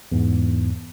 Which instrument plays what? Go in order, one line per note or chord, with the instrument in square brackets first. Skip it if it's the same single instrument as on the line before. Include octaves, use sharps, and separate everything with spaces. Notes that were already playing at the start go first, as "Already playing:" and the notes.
[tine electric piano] E2 G#2